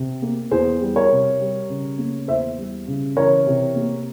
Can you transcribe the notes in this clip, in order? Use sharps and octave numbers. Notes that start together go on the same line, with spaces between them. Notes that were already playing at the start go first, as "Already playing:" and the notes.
Already playing: C3
A#3
E2 G#4 C5
G3
A#4 C#5
C3
G3
C#3
A#3
E2 C5 E5
G3
C#3
E3 A#4 C#5
C3
A#3